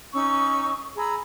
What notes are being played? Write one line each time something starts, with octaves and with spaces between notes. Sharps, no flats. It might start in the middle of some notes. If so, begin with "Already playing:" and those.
C#4 D#4 C#6 E6
G#4 A#5 B5 E6